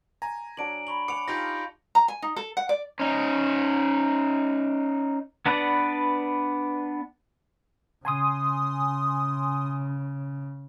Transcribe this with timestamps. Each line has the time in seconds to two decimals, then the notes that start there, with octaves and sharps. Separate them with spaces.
0.22 G#5 A#5
0.57 F#3 D4 D6 D7 F#7
0.87 B5 C#6 F#7
1.08 F#5 G#5 D6 C#7 F7
1.28 D#4 F4 G4 F5 G6 A#6
1.95 A#5
2.08 G#5
2.22 D#4
2.36 A4
2.57 F#5
2.69 D5
2.99 C#4 D#4
5.46 B3 D4 B4 D5 F#5
8.05 C#3 G#5 C6 D#6